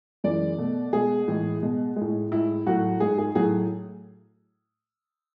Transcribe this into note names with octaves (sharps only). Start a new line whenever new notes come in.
F#2 E3 G#3 D5
B2 A3
B2 G#3 G#4
A2 E3 G#3
B2 G#3
G#3
A2
A2 G#3 E4
A2 F#3 A3 F#4
G#2 G#3 G#4
G#4
A2 F#3 A3 G#4